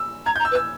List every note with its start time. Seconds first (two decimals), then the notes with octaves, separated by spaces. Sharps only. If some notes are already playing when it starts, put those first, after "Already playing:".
Already playing: E6
0.25 A#5 G#6
0.36 G6
0.39 A#5
0.45 E6
0.51 B4
0.55 E6